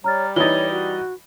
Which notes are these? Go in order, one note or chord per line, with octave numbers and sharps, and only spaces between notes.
G3 C#5 A#5 F6 A6
E3 D#4 C#5 A6 G7
F#4